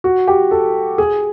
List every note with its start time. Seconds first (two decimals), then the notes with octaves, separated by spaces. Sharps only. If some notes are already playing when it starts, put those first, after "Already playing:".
0.04 F#4
0.28 G4
0.51 A4
0.98 G#4